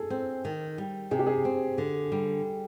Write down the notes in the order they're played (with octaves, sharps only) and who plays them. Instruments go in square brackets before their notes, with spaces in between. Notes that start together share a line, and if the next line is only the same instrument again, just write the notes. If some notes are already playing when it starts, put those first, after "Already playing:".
Already playing: [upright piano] G#4 A4
[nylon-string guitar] C4
D#3
G3
[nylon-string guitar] C3 [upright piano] G#4
[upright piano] G4
G#4
[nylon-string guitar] C4
D3
G3